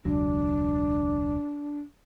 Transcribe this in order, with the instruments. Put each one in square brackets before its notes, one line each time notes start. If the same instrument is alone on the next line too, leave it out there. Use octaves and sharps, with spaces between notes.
[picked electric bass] E1 C#2 F#3 [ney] D4